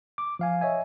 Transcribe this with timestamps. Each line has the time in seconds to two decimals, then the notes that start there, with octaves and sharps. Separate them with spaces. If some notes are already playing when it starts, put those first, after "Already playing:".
0.18 D6
0.39 F3 F5 G#5
0.61 C#5 D#5 E5 G#5